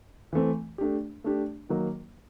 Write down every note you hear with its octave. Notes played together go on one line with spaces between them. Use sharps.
E3 A3 C4
A3 D4 G4
A3 D4 G4
D#3 F#3 A#3 D#4